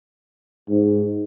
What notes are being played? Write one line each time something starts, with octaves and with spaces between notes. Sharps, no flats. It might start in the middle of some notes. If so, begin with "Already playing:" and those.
G#2